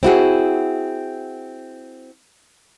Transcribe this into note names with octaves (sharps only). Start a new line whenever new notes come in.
C4 E4 F#4 G#4